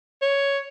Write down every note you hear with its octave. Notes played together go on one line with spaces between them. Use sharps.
C#5